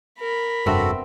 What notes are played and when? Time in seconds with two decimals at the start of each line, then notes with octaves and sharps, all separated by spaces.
0.19 A#4 B5
0.66 F1 G2 B3 C4 D4 F#4 A4 E5